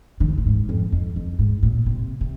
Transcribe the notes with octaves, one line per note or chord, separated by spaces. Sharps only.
D#3
C3
A#2
G#2
F2
F2
F2
G#2
A#2
C3
C3